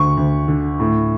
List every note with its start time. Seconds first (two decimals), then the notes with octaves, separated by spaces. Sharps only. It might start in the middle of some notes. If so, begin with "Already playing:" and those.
Already playing: D2 C#6
0.17 D2
0.48 D3
0.80 A2